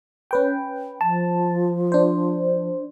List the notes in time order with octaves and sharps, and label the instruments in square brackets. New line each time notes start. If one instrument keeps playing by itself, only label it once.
[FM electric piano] C#4 B4 G5
[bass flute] F3 [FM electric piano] A5
[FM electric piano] D4 C5